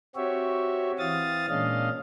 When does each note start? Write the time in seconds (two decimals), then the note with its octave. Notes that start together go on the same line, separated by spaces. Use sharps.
0.16 C4 F#4 G4 C#5 E5
0.99 E3 C4 F5 D#6 A6
1.49 A#2 G#3 C#4 D4 D#5 F5